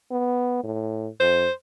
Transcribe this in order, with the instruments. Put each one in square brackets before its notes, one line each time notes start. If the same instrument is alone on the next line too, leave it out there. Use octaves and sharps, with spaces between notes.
[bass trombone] B3
A2
[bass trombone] F2 [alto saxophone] C5